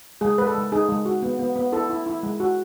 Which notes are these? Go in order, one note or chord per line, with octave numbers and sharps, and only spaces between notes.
G#3 G#4
G#3 B4
A4
G#3
D#4 G#4
G#3
F#4
B3
B3
B3
E4 A4
E4
E4
G#3
F#4